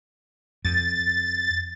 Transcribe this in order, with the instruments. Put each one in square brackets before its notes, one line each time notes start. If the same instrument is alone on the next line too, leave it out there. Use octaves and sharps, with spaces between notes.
[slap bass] F2 [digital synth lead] A6